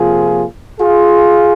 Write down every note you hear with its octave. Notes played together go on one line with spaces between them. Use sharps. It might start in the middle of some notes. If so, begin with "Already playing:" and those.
Already playing: C3 F3 A#3 F4 G#4
F4 G#4